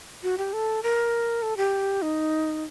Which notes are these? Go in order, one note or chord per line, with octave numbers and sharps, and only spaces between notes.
F#4
G4
A4
A#4
A4
G4
D#4